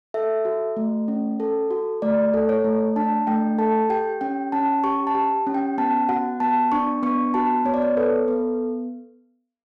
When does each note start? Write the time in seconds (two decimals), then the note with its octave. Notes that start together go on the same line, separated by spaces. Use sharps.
0.14 A4 E5
0.45 F#4
0.77 A3
1.08 C#4
1.40 A4
1.71 F#4
2.02 A3 D5
2.34 A4
2.49 C#5
2.64 A3
2.96 D4 A5
3.27 A3 G5
3.58 A4 A5
3.90 G4 G5
4.21 C#4 G5
4.52 C#4 A5
4.84 G4 C#6
5.07 A5
5.15 G4
5.47 C#4
5.54 G5
5.78 B3 A5
6.09 F#4 F#5
6.40 B3 A5
6.72 D4 C#6
7.03 B3 C#6
7.34 F#4 A5
7.65 B3 C#5
7.74 D5
7.82 C#5
7.97 A4 B4
8.28 B3